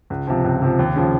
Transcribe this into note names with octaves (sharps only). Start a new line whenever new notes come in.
C#2
C3 F3
C#2
C3 F3
D#2
C#3 F3